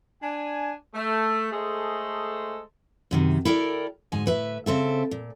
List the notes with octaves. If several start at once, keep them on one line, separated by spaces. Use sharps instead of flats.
D4 G#5
A3
G#3 A3 G#4 A4 C5 D#5
F#2 C3 D#3
E4 A4 A#4 D5 G5
D2 G#2 D#4 G#5
A2 B4 E5
C#3 C4 A4 E5
A#2